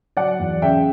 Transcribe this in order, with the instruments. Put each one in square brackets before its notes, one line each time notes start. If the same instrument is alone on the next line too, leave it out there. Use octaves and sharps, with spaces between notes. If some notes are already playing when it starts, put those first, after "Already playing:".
[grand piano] F#3 [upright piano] D5 F#5
[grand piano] E2
[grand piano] C#3 [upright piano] E5 G5